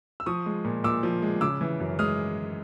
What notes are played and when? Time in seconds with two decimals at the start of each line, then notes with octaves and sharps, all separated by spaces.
0.20 E6
0.26 F3 C#6 D#6
0.46 G#3
0.65 A#2
0.84 A#2 D6 E6
1.03 F3
1.22 G#3
1.41 C#3 D6 E6
1.61 E3
1.80 F#2
1.99 G#3 D#6 F6